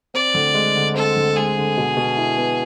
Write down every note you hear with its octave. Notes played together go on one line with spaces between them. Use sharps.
C4 D5
D2
G#3
D3
C4 A4
D2
G#3 G#4
D3
B2
B2
E4
B3